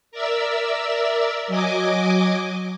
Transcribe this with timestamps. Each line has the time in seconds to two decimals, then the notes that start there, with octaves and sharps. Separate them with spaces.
0.12 A#4 D5 E5 E6
1.48 F#3 D#5 G#5 D6